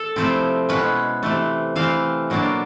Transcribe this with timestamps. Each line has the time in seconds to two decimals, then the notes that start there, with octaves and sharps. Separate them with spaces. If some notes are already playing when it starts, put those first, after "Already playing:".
Already playing: A4
0.16 C3 F3 A3 C4 E4
0.69 B2 G#3 C#4 E4 B4
1.23 C3 E3 A3
1.76 E3 A3 C4 F5
2.30 B2 F#3 A#3 D4